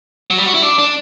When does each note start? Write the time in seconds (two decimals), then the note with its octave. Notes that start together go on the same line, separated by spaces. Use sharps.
0.30 F#3
0.38 G3
0.46 F#4
0.54 E4
0.62 D4
0.79 D4